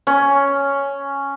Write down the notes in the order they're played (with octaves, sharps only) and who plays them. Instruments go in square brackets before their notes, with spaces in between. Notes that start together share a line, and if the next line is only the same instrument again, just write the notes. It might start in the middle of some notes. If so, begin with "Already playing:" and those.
[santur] C#4